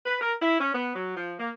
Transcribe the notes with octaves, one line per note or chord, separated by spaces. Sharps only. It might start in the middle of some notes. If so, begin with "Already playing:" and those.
B4
A#4
E4
C#4
B3
F#3
F3
A#3